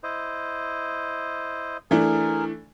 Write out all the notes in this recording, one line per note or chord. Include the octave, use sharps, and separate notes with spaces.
E4 C5 D#5
E3 A3 D4 G#4 A#4